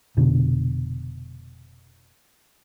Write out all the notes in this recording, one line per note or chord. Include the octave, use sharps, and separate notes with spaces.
F1 B2 D3